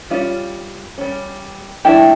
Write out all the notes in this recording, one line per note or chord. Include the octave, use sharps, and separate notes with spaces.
G3 C#4 F4
G3 C#4
F3 A3 D4 E4 G4